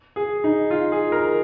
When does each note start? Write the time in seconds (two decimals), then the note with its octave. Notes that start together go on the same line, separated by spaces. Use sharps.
0.16 G#4
0.44 D#4
0.70 F4
0.92 G#4
1.12 A#4